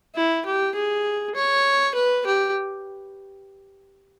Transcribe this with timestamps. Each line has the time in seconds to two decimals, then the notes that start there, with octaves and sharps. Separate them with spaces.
0.15 E4
0.46 G4
0.75 G#4
1.35 C#5
1.95 B4
2.26 G4